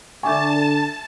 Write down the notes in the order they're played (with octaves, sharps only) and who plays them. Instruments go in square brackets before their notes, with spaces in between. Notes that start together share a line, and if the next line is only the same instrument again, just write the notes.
[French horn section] D3 [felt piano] E5 G#5 [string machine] A5 [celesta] C#6 D6 G6
[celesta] A4